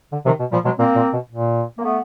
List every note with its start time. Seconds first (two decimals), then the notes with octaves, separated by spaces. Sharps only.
0.12 D3
0.25 C3 D#3 F3
0.39 B2
0.52 A#2 F3 G3
0.64 B2 F#3 G#3
0.78 A#2 A#3 C4
0.96 A#2
1.13 B2
1.31 A#2
1.78 A#3
1.83 A3 B3